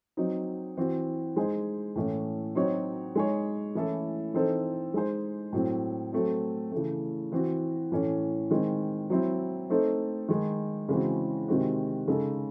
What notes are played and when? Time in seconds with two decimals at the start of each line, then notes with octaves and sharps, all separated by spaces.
0.17 F#3 C4 D#4
0.77 E3 C4 F#4
1.36 G#3 D#4 G#4 C5
1.96 A2 E3 A3 C#4
2.55 F#3 C4 D#4 F#4 C#5
3.15 G#3 D#4 G#4 C#5
3.75 E3 A3 C#4 E4 A4
4.34 E3 C4 D#4 A4 C5
4.94 G#3 D#4 G#4 C5
5.53 A2 F#3 C4
6.13 F#3 A3 C4
6.72 C#3 E3 A3
7.32 E3 C4 F#4
7.92 A2 E3 A3 C#4
8.51 D#3 G#3 C4
9.10 F#3 C4 E4 C5
9.70 A3 C4 D#4 A4 C5
10.29 D#3 G#3 D#4
10.89 C#3 E3 G#3 C4 F#4
11.48 C3 D#3 G#3 C4 F#4
12.08 C#3 G#3 D#4 A4